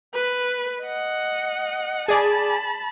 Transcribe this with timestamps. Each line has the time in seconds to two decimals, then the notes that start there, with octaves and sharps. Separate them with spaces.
0.14 B4
0.82 D#5 F#5
2.08 G#4 D5 G#5 A5 B5